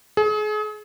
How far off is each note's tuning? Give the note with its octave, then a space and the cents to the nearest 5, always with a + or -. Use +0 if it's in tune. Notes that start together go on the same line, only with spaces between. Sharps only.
G#4 +35